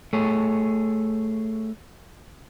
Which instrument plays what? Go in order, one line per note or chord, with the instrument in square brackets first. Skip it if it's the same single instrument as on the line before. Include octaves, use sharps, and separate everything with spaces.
[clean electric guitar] A3 G#4 C#5